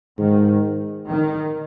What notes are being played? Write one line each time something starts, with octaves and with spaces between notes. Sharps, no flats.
G#2 D#3
D#3